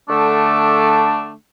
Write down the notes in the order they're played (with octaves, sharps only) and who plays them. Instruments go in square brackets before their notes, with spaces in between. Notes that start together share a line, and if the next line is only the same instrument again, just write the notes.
[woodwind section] D3 A3 D4